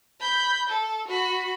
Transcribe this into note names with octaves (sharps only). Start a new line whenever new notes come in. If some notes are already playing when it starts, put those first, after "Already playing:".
B5 G6
A4
F#4 B5